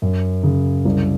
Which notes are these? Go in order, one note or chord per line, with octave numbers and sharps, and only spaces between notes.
F#2
C#3
C2